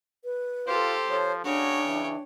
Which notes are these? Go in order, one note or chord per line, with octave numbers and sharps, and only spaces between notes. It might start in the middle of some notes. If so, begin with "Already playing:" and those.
B4
F4 G4 A4 C5
F3 C#5
C#3 D4 F#4 C#5 G5
E3